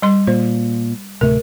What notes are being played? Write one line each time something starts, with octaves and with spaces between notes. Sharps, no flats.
G3 C6
A#2 C5
D1 C3 A3 A#4